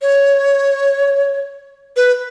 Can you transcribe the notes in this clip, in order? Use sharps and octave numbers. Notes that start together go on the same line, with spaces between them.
C#5
B4